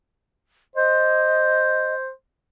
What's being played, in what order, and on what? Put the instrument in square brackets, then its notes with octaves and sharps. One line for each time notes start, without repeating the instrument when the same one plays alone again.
[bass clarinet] C5 [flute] D#5